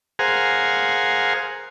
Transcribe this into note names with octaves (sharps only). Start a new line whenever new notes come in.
G#4 A#4 C5 F5 F#5 G#5